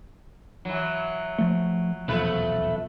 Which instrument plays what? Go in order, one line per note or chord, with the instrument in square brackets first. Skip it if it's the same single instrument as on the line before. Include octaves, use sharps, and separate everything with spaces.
[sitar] E3 F#3
[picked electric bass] F3 A3
[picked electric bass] D#1 B1 E2 [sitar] F3 A3 B4